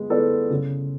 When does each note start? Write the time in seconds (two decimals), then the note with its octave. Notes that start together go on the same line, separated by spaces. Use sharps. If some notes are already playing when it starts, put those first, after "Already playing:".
Already playing: G#3 B3
0.10 B3 E4 A4 D5
0.50 C#3